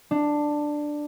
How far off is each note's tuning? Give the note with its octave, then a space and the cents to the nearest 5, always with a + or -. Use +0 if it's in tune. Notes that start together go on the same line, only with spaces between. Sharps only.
D4 +10